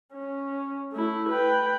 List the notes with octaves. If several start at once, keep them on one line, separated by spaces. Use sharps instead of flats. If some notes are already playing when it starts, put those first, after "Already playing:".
C#4
A3 E4
B4 G5